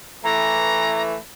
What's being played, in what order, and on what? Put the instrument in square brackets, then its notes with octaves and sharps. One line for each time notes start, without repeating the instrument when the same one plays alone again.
[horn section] E3 A3 [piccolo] A#5